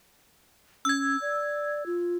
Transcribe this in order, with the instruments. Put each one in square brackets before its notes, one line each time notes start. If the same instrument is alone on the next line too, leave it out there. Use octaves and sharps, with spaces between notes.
[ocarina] C#4 [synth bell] E6 G#6
[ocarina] D5
F4